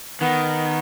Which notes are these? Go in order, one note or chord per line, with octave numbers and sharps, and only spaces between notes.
D#3 B3